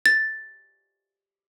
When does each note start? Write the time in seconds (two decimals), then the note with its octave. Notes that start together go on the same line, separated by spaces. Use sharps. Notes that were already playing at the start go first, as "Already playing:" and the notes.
0.06 A6